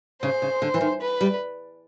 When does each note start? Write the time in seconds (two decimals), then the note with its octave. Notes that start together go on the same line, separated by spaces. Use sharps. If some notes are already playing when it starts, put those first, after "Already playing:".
0.23 C#3 C5
0.42 C#3
0.62 D3
0.74 E3
0.81 D#3
1.01 B4
1.21 G3